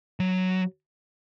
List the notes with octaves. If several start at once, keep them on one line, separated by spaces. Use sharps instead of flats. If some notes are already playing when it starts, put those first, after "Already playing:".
F#3